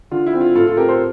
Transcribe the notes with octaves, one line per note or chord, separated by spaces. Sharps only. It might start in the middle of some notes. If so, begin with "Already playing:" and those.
D3 F4
E4
C4
F4
A2 F4 A4
F4 A4
C4 G4 A#4
A4 C5